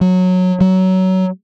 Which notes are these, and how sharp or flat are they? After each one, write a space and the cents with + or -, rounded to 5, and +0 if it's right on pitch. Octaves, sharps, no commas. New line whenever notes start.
F#3 -15
F#3 +15